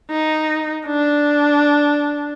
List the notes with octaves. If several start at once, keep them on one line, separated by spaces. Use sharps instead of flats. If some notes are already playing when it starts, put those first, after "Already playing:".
D#4
D4